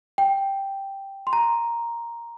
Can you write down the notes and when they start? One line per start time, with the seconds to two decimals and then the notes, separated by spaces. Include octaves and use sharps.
0.18 G5
1.27 C6
1.33 A#5